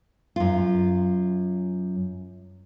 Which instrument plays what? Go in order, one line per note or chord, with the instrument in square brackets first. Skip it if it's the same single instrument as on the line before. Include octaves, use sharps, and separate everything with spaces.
[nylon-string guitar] F#2 F4